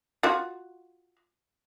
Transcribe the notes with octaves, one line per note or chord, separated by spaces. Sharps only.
F4 F#4